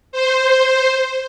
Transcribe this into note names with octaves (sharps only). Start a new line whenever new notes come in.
C5